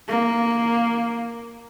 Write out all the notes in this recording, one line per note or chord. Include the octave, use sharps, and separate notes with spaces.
A#3